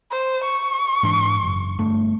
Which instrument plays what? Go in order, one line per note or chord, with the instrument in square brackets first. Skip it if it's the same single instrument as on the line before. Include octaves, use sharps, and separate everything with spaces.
[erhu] C5
C#6
[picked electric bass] G#2 E3 D4
F#1
G1 A3 D4